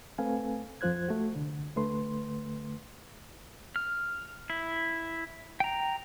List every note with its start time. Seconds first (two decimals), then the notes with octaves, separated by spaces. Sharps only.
0.18 A3 C4 A4 B4 F5 G#5
0.81 F2 F3 F4 C5 F#6 G#6
1.08 A3 F#4
1.36 C2 D3
1.76 D2 D3 A3 B4 C6
3.76 F6
4.50 E4
5.60 G5 A#5